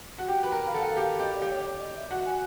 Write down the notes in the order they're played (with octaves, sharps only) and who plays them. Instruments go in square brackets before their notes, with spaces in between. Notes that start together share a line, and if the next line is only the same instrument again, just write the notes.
[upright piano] F#4
[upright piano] G4 [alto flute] G5
[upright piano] B4
A#4
[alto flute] F5
[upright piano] A4 [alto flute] F#5
[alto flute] F5
[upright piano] G4
[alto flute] F5
[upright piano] G4 [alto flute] D#5
[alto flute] D5
[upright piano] G4
[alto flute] C#5
D5
D#5
E5
[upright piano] F#4 [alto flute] F#5
[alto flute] G#5